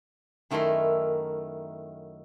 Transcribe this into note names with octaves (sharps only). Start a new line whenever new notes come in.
F#2 D#3 A3 E4 A#4 C6